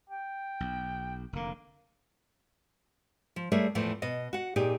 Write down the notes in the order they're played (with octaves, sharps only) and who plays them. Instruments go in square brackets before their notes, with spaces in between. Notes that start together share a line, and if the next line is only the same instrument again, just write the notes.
[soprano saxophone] G5
[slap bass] B1
[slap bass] F1 D3 [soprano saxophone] A#3
[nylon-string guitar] F3
G3 A3 G#4 A#4 C#5 E5
E2 A2 E3 F3 A3
B2 D#5
F#4 F#5
A#2 D#4 G4 G#4